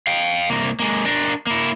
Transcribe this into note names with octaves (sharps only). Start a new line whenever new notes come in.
F5 G5
C2 A#3
G#3 A#3
D4 A#4
A#3 E4